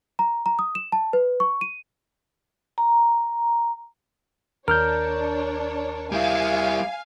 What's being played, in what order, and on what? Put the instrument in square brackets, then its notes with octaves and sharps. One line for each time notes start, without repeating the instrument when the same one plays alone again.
[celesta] A#5
A#5
D#6
E7
A5
B4
C#6
D#7
[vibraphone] A#5
[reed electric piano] D#2 F6 G6 [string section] D4 C#5 [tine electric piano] A#4
[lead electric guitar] G3 E4 [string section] F5 G#5